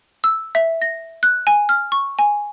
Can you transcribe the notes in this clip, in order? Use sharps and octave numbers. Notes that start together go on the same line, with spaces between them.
E6
E5
A#6
F#6
G#5
F6
C#6
G#5